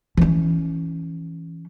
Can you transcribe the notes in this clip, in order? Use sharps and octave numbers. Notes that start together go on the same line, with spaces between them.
E3 C#4